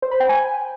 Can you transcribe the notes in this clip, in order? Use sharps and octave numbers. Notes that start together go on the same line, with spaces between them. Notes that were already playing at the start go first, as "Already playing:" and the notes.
C5
B5
G5
G#5